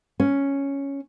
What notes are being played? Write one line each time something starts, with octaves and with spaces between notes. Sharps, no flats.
C#4